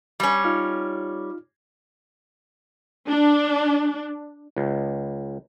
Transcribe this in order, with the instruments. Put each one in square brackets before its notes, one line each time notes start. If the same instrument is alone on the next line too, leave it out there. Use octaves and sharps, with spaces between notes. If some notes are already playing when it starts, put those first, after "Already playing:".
[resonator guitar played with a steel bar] G3 C#4
[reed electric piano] D#4 F4 F6
[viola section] D4
[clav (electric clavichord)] C#2